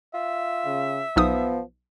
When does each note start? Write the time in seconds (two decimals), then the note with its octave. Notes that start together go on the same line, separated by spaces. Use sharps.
0.14 F4 E5
0.66 C#3
1.16 B1 F3 B3 D#4 D#6